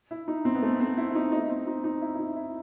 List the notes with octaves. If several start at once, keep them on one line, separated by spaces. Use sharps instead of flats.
E4
D#4
C4
B3
A3
C4
E4
E4
D#4
D#4
C4
D#4
D#4
E4
E4
D#4
E4